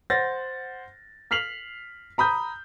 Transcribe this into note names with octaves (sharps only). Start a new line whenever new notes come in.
C5 F#5 A6 A#6
F6 B6 C7 F7 F#7
A#5 B5 D#6 G6